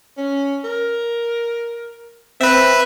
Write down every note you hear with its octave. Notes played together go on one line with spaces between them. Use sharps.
C#4
A#4
C4 B4 E5